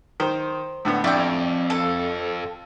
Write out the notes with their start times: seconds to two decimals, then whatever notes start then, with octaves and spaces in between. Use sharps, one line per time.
0.20 D#3 C5
0.85 A2 D3 B3
1.04 A1 F2 D4 E4 D5 G5
1.70 A4